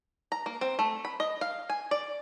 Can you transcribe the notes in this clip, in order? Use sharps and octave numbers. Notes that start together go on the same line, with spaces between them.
A#5
A#3
C4
A3
B5
D#5
F5
G#5
D5